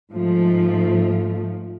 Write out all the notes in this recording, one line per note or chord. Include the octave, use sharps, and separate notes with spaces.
G#2 F3 A3